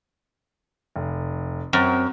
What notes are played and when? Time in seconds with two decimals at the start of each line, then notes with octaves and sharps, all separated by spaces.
0.96 F1
1.73 F#2 C4